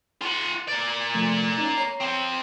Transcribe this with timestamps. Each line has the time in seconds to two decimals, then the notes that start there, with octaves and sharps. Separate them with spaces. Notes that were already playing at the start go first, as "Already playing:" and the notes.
0.22 F4 F#5
0.68 A#3 D5
1.15 C3 F3 A3
1.58 C#4 D#4
1.77 C#5 A#5 C7
2.01 F3 C4